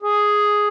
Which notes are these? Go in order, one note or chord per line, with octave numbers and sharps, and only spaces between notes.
G#4